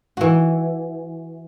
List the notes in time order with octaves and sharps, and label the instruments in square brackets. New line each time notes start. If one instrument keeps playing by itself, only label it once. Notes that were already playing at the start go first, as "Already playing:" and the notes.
[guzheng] E3 F#4